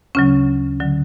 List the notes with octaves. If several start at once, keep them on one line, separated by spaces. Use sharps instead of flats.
D2 C#3 F#3 C#4
D3 F#3